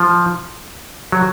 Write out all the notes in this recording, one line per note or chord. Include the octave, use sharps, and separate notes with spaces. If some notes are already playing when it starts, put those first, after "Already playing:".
Already playing: F3
F#3